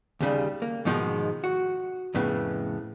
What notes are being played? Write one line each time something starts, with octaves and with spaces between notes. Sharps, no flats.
D#2 C#3 G3
A#3
G#2 B2 D#3 F3 G3 G#3
F#4
F2 A2 C#3 B3